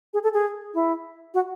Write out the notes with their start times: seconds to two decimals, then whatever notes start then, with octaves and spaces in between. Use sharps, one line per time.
0.13 G#4
0.23 A4
0.34 G#4
0.74 E4
1.34 F#4